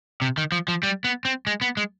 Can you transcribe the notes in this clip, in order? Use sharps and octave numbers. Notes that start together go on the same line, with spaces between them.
C3
D#3
F3
F3
G3
B3
C4
G#3
B3
G#3